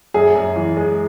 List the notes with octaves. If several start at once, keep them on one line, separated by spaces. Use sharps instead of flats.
F#2 G#4
F#2
E3
G#3